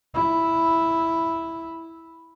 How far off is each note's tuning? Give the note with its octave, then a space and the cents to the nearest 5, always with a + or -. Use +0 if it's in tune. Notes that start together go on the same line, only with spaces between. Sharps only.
E4 +0